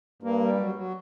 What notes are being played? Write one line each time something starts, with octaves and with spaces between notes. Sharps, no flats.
G2 A#3
G3
F#3
F#3